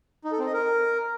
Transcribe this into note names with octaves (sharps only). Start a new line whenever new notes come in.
D#4
A4
C4
D#5
A#4